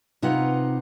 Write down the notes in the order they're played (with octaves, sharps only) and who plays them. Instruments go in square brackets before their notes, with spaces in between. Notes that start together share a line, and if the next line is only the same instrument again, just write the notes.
[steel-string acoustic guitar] C3 D#4 F4 B4 F#5